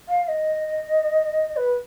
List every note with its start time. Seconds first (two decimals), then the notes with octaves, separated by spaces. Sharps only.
0.09 F5
0.24 F5
0.28 D#5
1.56 B4